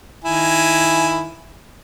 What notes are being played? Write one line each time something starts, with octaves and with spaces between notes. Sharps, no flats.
D#3 E4 G#5